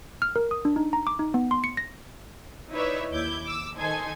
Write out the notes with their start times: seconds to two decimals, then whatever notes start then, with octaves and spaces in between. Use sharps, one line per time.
0.22 F6
0.36 A#4
0.51 D#6
0.65 D4
0.76 D#4
0.93 A#5
1.07 D6
1.19 D#4
1.34 B3
1.51 C6
1.64 C#7
1.77 A#6
2.73 D#4 E4 B4 C#5 D5 E5
3.11 D#2 E4 D6 G6 G#6
3.43 D6 E6
3.76 D#3 D#4 A4 C5 G#5 G#6